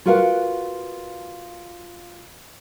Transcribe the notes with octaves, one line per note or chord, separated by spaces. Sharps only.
F4 F#4 A#4 B4 F5 F#5